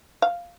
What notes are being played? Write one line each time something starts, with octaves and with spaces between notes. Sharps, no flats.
F5